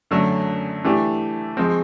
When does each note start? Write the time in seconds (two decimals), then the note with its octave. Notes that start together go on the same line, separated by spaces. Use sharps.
0.11 F#2 D3 F#3 A3
0.84 E3 A3 D4 G4
1.57 F3 G#3 C4